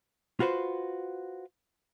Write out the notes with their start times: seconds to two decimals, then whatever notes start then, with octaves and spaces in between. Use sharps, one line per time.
0.40 F4 F#4 B4 C5